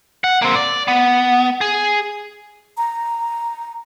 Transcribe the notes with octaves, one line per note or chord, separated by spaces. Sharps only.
F#5
A#3 C4
D5
B3
G#4
A#5